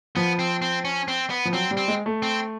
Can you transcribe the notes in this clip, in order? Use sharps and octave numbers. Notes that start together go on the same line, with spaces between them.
F3 B3
C4
C4
C#4
C4
B3
F3
F#3 C4
G3
C4
G#3
A3
C4